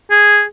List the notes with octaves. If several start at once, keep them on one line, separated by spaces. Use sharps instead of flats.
G#4